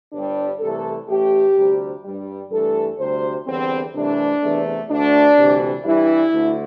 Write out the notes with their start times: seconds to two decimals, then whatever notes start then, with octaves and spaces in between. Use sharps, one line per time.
0.12 G1 G2 G3 D4
0.60 C2 C3 E3 A3 A4
1.08 A1 A2 A3 G4
1.56 D2 C3 G3
2.04 G2 G3
2.51 G2 E3 A3 A4
2.98 D2 C3 G3 C5
3.47 E2 D3 G3 C4
3.94 C2 C3 E3 A3 D4
4.43 E2 C3 A3
4.89 D2 D3 A3 D4
5.38 D2 C3 E3 G3
5.85 G2 E3 G3 E4
6.33 D2 D3 A3